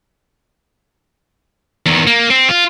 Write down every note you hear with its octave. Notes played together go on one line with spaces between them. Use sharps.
E2 D#3
A#3
C4
F4